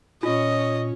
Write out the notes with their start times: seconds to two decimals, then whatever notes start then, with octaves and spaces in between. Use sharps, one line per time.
0.23 A#2 C#4 F4 C#5 D#5